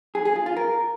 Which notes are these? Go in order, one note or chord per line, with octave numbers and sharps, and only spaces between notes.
G#4
G#4
F4
F4
A#4